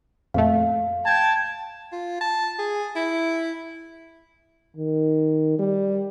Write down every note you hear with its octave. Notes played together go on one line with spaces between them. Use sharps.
F2 A#2 A3 F5
G5 A5 G#6
F4
A5
G#4
E4
D#3
G3